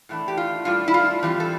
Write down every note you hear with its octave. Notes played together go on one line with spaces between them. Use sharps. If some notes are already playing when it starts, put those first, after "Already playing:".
A2 E3 A3 D4
G4
F4
A2 G3 D4 F4
E4
F4
E3 G3 C4
A4